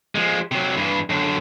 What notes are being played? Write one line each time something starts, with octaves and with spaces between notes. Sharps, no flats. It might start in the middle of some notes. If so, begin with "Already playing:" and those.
F3 G#3
C3 F#3
G2 E3
F#2 D3